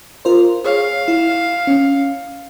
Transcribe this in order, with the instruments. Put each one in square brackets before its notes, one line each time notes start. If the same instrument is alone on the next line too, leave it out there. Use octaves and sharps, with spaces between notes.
[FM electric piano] F4 A#4 C5
[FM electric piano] G#4 C#5 [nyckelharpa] F5
[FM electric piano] E4
C#4